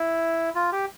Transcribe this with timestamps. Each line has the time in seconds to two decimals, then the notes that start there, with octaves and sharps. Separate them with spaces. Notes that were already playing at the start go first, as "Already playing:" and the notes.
Already playing: E4
0.55 F4
0.72 G4